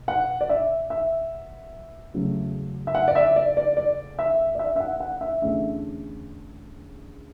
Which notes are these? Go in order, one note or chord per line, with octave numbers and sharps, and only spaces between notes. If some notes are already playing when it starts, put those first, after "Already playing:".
Already playing: B2
F#5
D5
E5
E5
E2 C#3 F#3 A3 C#4
E5
F#5
D5
E5
D5
D5
D5
E5
D5
E5
E5
F#5
F#5
E5
E2 D3 A3 C#4 E5